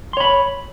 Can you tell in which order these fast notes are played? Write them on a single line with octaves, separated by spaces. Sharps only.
C6 C#5 B5